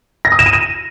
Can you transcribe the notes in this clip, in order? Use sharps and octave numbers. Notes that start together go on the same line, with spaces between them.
A#6
D#6
E7
D#7
E7